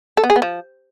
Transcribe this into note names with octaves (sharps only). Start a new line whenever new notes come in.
A4
B3
G#4
B3
F3